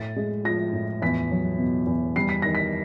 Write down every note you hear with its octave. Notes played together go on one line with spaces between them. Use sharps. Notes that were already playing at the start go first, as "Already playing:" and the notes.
Already playing: A2 A6
G#3
F3 A#6
A2
E2 B6
F#3
B2
E2
G3 C7
B6
D#3 A#6
B6